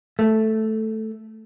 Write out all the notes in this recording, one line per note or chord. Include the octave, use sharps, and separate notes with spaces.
A3